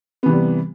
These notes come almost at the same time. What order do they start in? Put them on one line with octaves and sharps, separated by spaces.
B3 E3 C3 G3